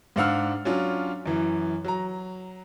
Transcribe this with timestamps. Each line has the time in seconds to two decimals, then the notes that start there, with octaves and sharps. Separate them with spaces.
0.16 G#2 D4 F5 F#5 E6 F6
0.65 F#3 C#4 D4 F4
1.26 F#2 E3
1.85 F#3 A#5